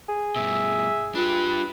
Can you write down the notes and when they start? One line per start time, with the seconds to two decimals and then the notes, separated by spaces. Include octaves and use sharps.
0.09 G#4
0.36 G2 B2 E5
1.15 D4 F4 G4 B4